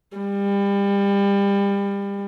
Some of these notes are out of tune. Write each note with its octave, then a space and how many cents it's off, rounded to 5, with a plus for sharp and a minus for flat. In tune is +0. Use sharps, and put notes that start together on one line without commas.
G3 +30